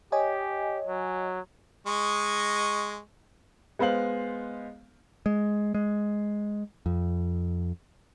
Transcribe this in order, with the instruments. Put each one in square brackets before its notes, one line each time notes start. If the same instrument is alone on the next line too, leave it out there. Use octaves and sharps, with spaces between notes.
[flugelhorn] G4 [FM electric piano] C#5 D#5 G#5
[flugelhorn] F#3
[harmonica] G#3 D#5 C#6
[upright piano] G#3 B3 C5 F5 F#7
[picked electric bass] G#3
G#3
F2